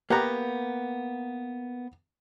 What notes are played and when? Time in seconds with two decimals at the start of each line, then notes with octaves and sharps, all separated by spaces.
0.10 A#3 B3 G4 F#5 A#5